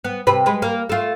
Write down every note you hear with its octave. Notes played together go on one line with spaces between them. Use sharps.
B3
C3 B4
G#3 B4
A#3
A3 F4